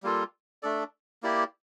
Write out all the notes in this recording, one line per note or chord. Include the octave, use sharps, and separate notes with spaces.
G3 A#3 F4 A4
A3 D4 A4 D5
A#3 E4 G4 D5